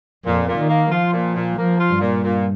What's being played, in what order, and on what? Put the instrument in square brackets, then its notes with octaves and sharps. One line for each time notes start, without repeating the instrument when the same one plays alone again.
[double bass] F2 [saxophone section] A#2
[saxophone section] A#2
[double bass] D#3
[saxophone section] A#3
[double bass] F3 [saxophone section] F4
[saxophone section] A#2
A#2
[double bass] F3 [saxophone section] A#3
[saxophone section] F4
[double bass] G2
[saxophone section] A#2
A#2